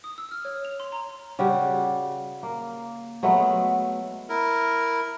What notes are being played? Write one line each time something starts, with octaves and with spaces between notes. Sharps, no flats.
D#6
E6
F6
C#5
F7
C6
A#5
C#3 G3 F#4
A#3
F#3 G#3 A3 B3
E4 A#4